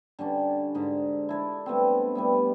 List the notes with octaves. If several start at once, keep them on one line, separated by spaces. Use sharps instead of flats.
D3 G3 C#4 D4
G#2 D3
E4 A4 D5
G3 A3 B3 C4
G3 A3 B3